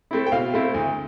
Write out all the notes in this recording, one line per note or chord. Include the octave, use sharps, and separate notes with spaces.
A3 C4 E4
G5
B2 F5
A3 C4 E4
D2